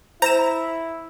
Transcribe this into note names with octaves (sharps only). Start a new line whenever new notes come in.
E4 C5 A#5 A#6 E7